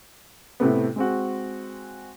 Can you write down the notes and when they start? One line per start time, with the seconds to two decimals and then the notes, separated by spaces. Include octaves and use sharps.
0.60 A2 C3 A3 B3
0.96 G#3 C4 F#4